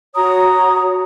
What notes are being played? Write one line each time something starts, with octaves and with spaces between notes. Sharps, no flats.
F#4 C#5 A#5 D#6